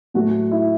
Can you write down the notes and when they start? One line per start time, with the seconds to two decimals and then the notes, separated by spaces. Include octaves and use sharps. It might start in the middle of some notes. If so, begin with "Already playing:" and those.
0.14 A2 F#3 A3 F#4
0.51 E4